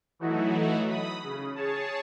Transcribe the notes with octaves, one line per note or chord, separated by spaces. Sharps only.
E3 F#3 A3 D#4 E4 F#4
B5 D#6
C#3
G#4 C#5 A5